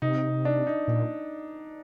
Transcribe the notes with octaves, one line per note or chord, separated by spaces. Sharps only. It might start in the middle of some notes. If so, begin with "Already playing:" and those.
C3 D#4
D4
D#4
A#2